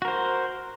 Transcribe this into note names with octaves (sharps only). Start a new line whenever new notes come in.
F#4 A#4 C5